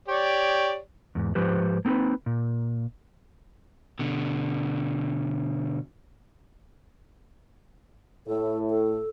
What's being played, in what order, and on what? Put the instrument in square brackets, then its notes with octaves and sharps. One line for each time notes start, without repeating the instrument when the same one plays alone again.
[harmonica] G4 C#5 D5
[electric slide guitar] E2 G#2
G#2 F3 G4 B4 C5
A#3 C4 D#4 A#4 B4
A#2
[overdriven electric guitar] B2 D3
[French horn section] A2 [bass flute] A4
[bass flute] A4